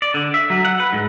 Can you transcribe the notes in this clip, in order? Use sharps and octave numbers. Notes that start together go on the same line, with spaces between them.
D5
D3
E5
F#3
F#5
B4
G#2